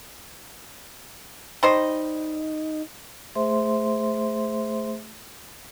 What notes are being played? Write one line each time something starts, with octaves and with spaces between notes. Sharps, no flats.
G3 D#4 C5 D#5
A3 G#4 C5 E5 C6